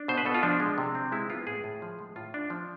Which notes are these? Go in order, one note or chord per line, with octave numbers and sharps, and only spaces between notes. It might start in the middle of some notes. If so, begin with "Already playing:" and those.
Already playing: D4
B2 C5
B4
B2 A4
F4
F3 D4
G#3
C3
C4
G#3 E4
B3 F4
A2 G#4
A2
F3
G#3
A2 F4
D4
F3